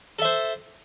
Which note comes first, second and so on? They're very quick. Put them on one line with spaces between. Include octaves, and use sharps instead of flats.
A4 E5 C5